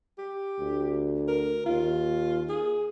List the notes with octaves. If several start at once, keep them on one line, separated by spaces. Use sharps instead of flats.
G4
D2
A#4
D#2 F4
G#4